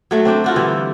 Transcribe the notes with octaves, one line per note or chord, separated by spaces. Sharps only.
F#3 A3 F#4
C4 D4 G5
F4 F#4 A4
D3 E3 G3